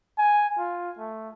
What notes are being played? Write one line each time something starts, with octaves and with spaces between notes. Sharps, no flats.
G#5
F4
A3